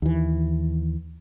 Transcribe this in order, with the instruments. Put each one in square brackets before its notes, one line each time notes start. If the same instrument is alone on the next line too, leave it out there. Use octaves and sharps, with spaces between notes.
[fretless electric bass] D#2 E3